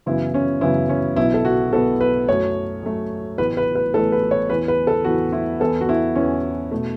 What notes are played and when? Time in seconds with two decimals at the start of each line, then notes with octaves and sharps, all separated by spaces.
0.06 F#2 C#3 E3 B3 E4
0.34 C#4
0.61 F#2 C#3 E3 B3 E4
0.89 C#4
1.16 B1 B2 B3 E4
1.34 A4
1.45 F#4
1.73 B1 B2 B3 A4
2.01 B4
2.29 F#2 F#3 A3 C#5
2.83 F#2 F#3 A3
3.38 A1 A2 E3 B3 B4
3.57 B4
3.75 B4
3.94 A1 A2 E3 B3 A4
4.12 B4
4.31 C#5
4.49 E2 E3 B3 B4
4.68 B4
4.87 A4
5.04 E2 E3 B3 F#4
5.32 E4
5.60 E2 E3 B3 A4
5.81 F#4
5.89 E4
6.16 E2 E3 B3 C#4
6.72 B2 A3